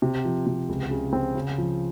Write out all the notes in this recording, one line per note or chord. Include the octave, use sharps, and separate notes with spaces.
C3
F3
C3
C#2
C#3
C4
C#3
F3